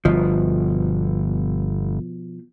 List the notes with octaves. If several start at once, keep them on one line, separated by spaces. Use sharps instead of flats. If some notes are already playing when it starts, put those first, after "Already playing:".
G1 B2 F3